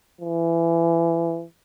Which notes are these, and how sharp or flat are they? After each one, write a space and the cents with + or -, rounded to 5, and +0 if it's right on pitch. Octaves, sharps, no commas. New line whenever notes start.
E3 +25